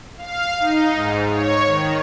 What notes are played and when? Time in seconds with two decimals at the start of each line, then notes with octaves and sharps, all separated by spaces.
0.18 F5
0.59 D#4
0.95 G#2
1.29 C#5
1.67 D#3